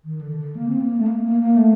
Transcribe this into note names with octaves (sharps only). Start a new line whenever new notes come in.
D#3
D3
D3
A#3
C4
A#3
A3
A#3
A#3
A#3
A3